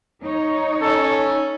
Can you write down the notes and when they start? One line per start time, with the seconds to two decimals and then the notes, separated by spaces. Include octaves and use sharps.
0.23 D#4 C#5
0.81 C#4 A4